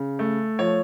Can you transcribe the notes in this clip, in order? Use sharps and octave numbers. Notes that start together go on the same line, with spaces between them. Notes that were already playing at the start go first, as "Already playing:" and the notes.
Already playing: C#3
A3
F3 C#5